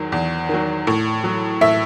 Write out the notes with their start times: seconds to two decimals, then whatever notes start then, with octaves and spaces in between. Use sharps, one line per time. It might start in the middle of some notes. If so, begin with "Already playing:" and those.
Already playing: E2 D#3 F#3
0.12 E2
0.49 D#3 F#3
0.87 A2
1.24 F#3
1.61 A2 E5